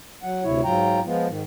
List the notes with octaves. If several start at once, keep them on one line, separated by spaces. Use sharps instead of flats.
F#3 F#5
D2 C3 E4 C#5
G#2 F#3 F4 G5 A#5
F3 G#3 B3 F4
G#2 D#3